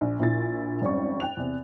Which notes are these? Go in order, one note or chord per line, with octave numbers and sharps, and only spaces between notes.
A#1
A#1 A#2 E4 A6
G#1 F2 G3 C#4 C#6
G5 F#6 F7
E2 C3